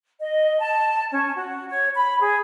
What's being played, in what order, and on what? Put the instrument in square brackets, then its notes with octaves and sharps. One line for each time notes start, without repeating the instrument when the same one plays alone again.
[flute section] D#5
A5
C#4
F#4
C#5
B5
G#4